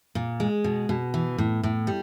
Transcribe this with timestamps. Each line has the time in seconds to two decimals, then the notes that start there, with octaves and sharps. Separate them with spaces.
0.15 A#2
0.40 G#3
0.64 B2
0.89 B2
1.14 E3
1.38 A2
1.63 A2
1.87 G3